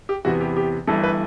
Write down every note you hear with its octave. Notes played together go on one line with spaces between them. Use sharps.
G4
E2 C3 E3 B3 F#4
G4
G4
G1 G2 E3 A3 A4
B4